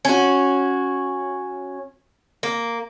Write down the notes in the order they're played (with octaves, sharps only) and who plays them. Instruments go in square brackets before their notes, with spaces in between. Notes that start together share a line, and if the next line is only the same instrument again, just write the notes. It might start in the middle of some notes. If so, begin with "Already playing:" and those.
[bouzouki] C#4 F#4
A#3